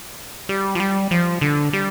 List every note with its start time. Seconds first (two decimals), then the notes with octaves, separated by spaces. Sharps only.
0.49 G3
0.75 F3
0.80 G3
1.11 F3
1.41 D3
1.73 G3